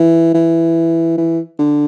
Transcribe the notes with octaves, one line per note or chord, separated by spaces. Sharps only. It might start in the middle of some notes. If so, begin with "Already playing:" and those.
Already playing: E3
E3
E3
D3